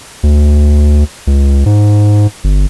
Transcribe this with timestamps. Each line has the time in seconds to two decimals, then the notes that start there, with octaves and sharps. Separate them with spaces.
0.23 D2
1.27 C#2
1.66 G#2
2.44 G1